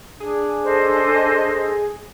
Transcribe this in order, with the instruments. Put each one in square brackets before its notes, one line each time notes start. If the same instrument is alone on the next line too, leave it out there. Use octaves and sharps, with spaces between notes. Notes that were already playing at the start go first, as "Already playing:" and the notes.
[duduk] D4 [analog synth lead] G#4
[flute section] A4 C5 D#5